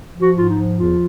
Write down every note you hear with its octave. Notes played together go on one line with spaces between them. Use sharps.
F3
F#4
G#2 F4
D#4
F3
E2 F4